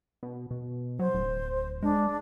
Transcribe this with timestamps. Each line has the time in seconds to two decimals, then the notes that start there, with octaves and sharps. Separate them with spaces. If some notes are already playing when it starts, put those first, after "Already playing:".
0.23 B2
0.51 B2
0.99 F#3 C5
1.14 D1
1.82 G#3 D4